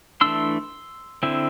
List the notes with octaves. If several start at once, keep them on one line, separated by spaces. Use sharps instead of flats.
E3 A3 D4 C6 E6
D3 C4 E4